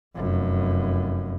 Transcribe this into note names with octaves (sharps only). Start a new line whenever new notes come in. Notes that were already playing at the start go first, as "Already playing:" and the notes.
F1 F#2